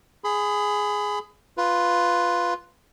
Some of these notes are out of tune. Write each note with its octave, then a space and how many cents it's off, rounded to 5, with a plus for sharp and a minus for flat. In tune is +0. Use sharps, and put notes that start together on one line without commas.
G#4 +0 B5 +30
F4 +0 B4 +0